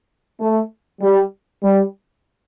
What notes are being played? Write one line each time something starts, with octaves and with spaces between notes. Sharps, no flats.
A3
G3
G3